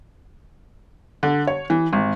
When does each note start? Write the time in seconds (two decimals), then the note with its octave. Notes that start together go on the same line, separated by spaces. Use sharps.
1.23 D3
1.47 C#5
1.70 E3
1.93 G#1